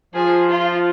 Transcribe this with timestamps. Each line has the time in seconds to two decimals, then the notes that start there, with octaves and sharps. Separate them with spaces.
0.15 F3 G#4
0.49 F4